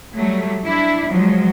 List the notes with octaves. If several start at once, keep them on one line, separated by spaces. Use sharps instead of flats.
F#3 G3 A3
D4 E4
F3 F#3 G#3